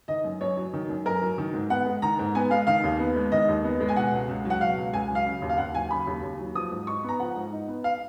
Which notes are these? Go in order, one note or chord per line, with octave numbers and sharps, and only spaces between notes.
D#3 D#5
F#2
F#2 C#5
F#3
D#3
F#2
F#2 A#4
F#3
D#3
G#2
B3 F#5
G#3
D#3 A#5
G#2
B3 G#5
G#3 F5
D#3 F5
D#2
B3
G#3
D#3 D#5
D#2
B3
G#3
G#5
B2 F#5
C#2
C#2
F#3
F#5
B2 F5
C#2
C#2 G#5
F#3
F5
C#3
D#2
F5
D#2 F#5
F#3 G#5
C#3 B5
D#2
D#2
F#3
F3 D#6
G#2
D#4 C#6
B3 A#5
F3 F#5
G#2
D#4
B3
F5